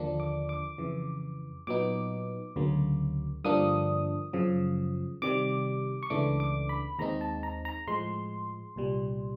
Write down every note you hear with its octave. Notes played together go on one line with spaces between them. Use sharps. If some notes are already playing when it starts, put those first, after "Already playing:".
Already playing: D#2 D3 F3 A#3 D4
D6
D6
F2 C#3 E3
A#2 F#3 B3 D#4 D6
D2 C#3 F#3 A#3
G2 D3 F3 A#3 D4 D#6
F#2 C#3 F3
C3 D#3 G3 D6
C#6
C#2 C#3 E3 A3 D4 D6
D6
B5
D#2 D#3 G#3 C4 D#4 A#5
A5
A#5
A#5
A2 F3 G#3 C6
C2 A#2 G3